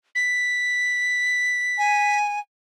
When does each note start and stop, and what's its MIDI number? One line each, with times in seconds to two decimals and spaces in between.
0.15 2.17 95
1.78 2.39 80